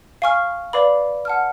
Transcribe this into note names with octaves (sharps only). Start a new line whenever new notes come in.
F5 G#5 C#6 F6
B4 D5 F5 B5 D6
F#5 A5 F6